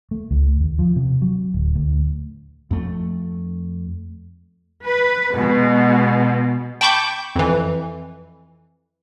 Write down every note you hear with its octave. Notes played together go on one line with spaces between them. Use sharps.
A3
C#2
D#2
F3
C3
F#3
D1
D2
F2 A3
B4
B2 G#3
G5 A5 B5 C#6 D6 G6
F2 E3